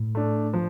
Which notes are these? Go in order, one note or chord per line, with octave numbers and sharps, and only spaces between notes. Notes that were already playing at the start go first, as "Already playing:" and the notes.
Already playing: A2
A3 D4
F3